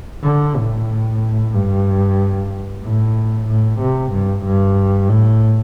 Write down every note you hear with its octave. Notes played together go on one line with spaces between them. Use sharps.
D3
A2
G2
A2
A2
C3
G2
G2
A2